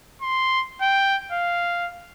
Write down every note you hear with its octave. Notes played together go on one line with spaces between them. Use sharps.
C6
G5
F5